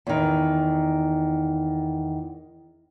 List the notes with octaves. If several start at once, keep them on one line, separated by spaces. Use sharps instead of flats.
E2 D#3